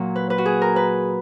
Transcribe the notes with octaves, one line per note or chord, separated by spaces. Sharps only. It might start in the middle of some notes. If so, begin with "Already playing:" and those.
Already playing: A#2 F#3
B4
B4
F#4
G#4
A#4
B4